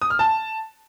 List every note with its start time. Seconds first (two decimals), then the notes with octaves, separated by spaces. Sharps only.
0.02 D#6
0.10 F6
0.19 A5